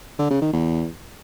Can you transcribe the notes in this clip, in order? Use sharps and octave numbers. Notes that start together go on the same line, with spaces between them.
D3
C#3
D#3
E2